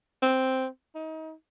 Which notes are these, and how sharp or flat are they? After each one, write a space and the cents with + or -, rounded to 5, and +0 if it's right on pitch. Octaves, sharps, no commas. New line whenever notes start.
C4 +0
D#4 +30